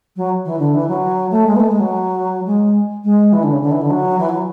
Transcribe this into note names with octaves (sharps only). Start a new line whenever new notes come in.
F#3
E3
D3
E3
F#3
A3
G#3
B3
A3
G#3
F#3
G#3
G#3
E3
D3
C#3
D3
E3
D3
F#3
E3
F#3